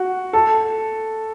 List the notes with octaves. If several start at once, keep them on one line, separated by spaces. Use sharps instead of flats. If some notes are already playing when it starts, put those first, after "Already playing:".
Already playing: F#4
A4